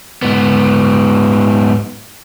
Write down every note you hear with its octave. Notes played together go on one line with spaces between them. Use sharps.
G#2 B3